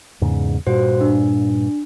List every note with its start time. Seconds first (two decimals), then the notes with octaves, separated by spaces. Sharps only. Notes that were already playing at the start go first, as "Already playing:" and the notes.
0.21 E2 G#2 C#3
0.67 G2 A#2 F#4 C5
1.01 D4